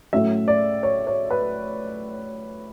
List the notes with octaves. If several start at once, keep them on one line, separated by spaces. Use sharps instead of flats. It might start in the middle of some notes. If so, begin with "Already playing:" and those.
A2 F#3 A3 C#4 E5
D5
C#5
C#5
B4